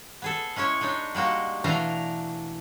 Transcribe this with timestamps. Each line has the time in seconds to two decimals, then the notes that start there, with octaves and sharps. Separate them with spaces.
0.22 B3 G#4 A4
0.56 G#3 C#4 E4 C#5
0.81 G#3 D4 D#4 C#5
1.15 G3 G#3 A#3 F#4
1.64 B2 E3 A3 D4 F5 A#5